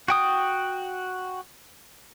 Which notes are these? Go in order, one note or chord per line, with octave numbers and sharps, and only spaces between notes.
F#4 G5 D#6